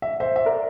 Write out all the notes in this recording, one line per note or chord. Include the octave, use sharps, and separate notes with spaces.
E5
C5 E5
E5
A#4 D5